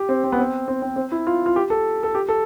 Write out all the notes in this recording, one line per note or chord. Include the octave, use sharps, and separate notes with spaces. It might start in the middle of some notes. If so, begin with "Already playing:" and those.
Already playing: G4
C4
C4
B3
C4
C4
C4
C4
E4
F4
F4
G4
A4
A4
G4
A4